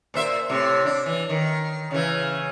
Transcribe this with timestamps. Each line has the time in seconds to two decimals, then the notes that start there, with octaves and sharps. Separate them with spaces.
0.14 A#2 C5 E5
0.49 A2 C3
0.85 D4
1.06 E3
1.29 D#3
1.91 C#3 E3